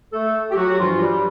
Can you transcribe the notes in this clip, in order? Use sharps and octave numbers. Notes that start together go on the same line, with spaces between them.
A3 A4
G4
F#3 F#4
G2 E3 F3 G3 F4
G3 G4